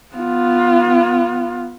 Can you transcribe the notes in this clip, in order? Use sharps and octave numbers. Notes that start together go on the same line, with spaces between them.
B3 F4